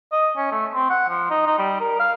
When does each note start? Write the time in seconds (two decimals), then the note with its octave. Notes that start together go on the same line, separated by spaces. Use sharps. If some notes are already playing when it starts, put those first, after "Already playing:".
0.12 D#5
0.37 C#4
0.51 A3
0.74 C4
0.90 F#5
1.09 F3
1.31 D#4
1.47 D#4
1.59 G3
1.80 A#4
2.00 F5